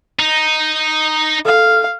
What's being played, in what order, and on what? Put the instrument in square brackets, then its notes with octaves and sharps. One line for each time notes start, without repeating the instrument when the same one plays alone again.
[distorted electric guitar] D#4
[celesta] A4 F6 [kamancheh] F5